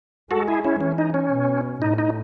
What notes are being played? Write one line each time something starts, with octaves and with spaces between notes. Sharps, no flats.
G#3 F#4 A4
E4 G#4
C#4 E4
E3 C#4
D#4
C#4
B2
A2 D#4
D#4